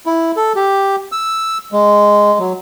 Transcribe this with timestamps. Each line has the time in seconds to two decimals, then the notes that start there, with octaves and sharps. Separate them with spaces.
0.06 E4
0.36 A4
0.56 G4
1.12 E6
1.72 G#3
2.39 F#3